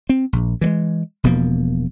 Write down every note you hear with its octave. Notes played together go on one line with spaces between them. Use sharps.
C4
A#1
E3 G3 G#3
E1 B2 F3 A#3